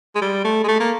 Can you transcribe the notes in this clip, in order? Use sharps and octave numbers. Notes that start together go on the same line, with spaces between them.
G#3
G3
A3
G#3
A3
A#3